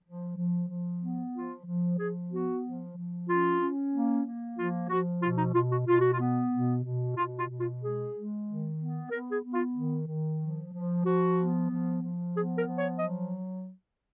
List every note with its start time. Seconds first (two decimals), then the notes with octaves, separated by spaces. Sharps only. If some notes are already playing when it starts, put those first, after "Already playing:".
0.04 F3
0.37 F3
0.69 F3
1.01 B3
1.33 F3 F4
1.66 F3
1.98 F3 G#4
2.30 B3 F#4
2.63 F3
2.96 F3
3.28 C#4 F4
3.60 C#4
3.93 A#3
4.25 A#3
4.57 F3 F4
4.89 F3 F#4
5.22 B2 F4
5.38 D#4
5.54 B2 F4
5.71 F#4
5.87 B2 F4
6.00 F#4
6.12 F4
6.20 B3
6.52 B2
6.84 B2
7.17 B2 F4
7.37 F4
7.49 B2
7.60 F4
7.81 G#3 G#4
8.14 G#3
8.46 D#3
8.79 B3
9.10 B3 A#4
9.32 G#4
9.43 B3
9.54 F4
9.75 D#3
10.07 D#3
10.40 F3
10.73 F3
11.05 F3 F#4
11.37 B3
11.70 F3
12.02 F3
12.34 B3 G#4
12.56 A#4
12.67 F3
12.77 C#5
12.99 F#3 D#5